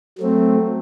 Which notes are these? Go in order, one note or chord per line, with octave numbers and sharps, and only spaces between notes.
F#3 A3 C4